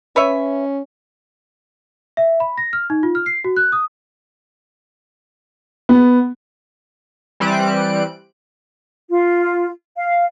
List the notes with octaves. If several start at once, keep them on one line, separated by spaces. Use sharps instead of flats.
C#4 B4 C#5 E5
E5
B5
A#6
F6
D#4
F4
F6
C7
F#4
F#6
D#6
B3
E3 G3 C4 F#6 D7
F4
F5